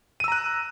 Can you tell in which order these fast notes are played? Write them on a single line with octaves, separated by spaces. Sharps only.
D#7 E6 A#5 F#6